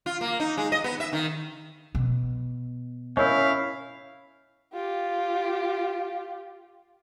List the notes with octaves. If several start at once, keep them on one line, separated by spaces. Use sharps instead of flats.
F4
A#3
D#4
G#3
D#5
B3
E5
D#3
B2
C#4 E4 A#4 C#5 D#5 F5
F4 G4